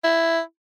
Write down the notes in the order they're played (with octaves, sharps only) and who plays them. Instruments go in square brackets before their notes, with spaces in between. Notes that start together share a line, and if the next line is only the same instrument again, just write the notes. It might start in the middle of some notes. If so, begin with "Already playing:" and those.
[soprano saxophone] E4